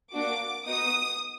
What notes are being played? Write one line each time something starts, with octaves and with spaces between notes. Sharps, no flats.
A#3 D4 F#4 D6
B3 D#4 F#4 D#6